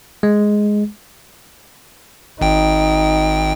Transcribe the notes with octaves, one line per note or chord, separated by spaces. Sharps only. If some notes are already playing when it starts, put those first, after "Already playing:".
G#3
G#1 D#4 G5